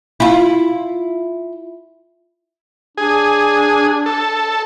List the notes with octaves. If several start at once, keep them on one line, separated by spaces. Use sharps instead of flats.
E4 F4
D4 G#4
A4